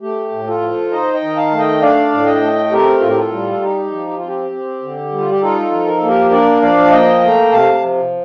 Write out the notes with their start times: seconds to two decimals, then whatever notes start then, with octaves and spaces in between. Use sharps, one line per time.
0.01 A3 G4
0.31 A2
0.47 F4 A4
0.62 F3
0.92 D#4 C5 D#5
1.14 D#5 G5
1.21 D#3
1.37 F5 A5
1.52 A3
1.59 D#5 G5
1.82 D4 D5 F5
2.11 A2
2.26 D#5 G5
2.42 A3
2.71 C4 G4 A#4
3.00 A2 F4
3.09 G4
3.17 F4 A4
3.32 G3
3.51 A4
3.61 D#4 G4
3.92 F3
4.07 G4
4.17 C4 F4
4.28 G4
4.52 C4
4.82 D3
5.12 G3
5.18 F4
5.30 G4
5.42 D#4 F4 A4
5.72 F3
5.87 A#4
5.97 A#3 A4
6.08 G4 A#4
6.31 D4 A#4 D5
6.62 F3 D5 F5
6.85 A5
6.92 A#3 D#5 G5
7.22 A3 G5 A#5
7.52 C3 F5 A5
7.82 F3